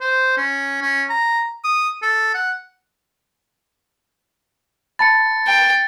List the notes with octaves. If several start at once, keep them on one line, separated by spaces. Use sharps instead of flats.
C5
C#4
C#4
A#5
D#6
A4
F#5
A5 B5 A6 C#7
G5